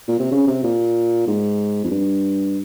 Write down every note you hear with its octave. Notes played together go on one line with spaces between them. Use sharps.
A#2
C3
C#3
C3
A#2
G#2
F2
G2